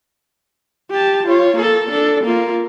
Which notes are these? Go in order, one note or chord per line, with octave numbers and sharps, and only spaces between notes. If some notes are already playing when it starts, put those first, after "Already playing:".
G4 A5
F4 C#5
A#3 A4
D4 A4
A#3 F4